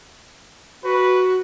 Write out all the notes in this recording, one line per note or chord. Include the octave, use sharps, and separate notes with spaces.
F#4 B4